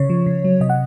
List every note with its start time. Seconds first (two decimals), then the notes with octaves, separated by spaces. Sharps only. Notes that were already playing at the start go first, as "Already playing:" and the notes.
Already playing: C#3 C#5
0.10 F3
0.26 C#3
0.44 F#3
0.60 C3 D#5
0.69 F#5